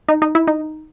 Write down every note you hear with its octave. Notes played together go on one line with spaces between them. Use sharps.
D#4
D#4
E4
D#4